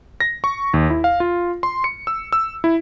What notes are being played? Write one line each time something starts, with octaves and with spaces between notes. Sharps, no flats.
A#6
C#6
D#2
E4
F5
F4
C6
C#7
E6
E6
E4